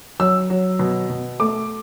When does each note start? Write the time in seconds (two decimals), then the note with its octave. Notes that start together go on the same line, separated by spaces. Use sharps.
0.20 F#3 E6
0.50 F#3
0.79 B2
1.10 B2
1.40 A3 D6